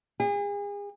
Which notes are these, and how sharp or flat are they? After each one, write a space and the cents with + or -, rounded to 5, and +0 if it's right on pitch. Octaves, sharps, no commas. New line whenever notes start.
G#4 -35